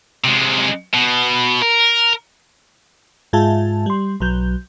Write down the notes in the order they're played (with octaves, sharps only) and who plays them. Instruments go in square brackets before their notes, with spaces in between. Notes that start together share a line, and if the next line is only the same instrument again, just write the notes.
[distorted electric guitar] C3 G#3
B2
A#4
[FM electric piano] G#2 G#3 F4 E5 A5
G3 C6
B1 F#3 G6